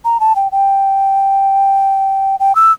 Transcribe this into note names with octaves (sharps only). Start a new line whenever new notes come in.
A#5
A5
G5
G5
G5
E6